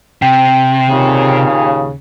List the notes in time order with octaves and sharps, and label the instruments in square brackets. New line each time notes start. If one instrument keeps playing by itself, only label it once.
[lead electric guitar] C3 [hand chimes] G5
[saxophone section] D#2 A#2 C#3